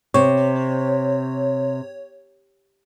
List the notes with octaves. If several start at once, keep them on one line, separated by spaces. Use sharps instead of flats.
C3 C#5